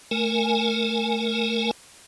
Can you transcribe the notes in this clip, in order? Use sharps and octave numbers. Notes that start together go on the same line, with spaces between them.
A3 A#4 G#5